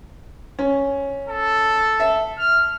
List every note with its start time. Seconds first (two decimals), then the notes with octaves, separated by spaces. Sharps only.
0.59 C#4
1.28 A4
2.00 E5
2.38 F6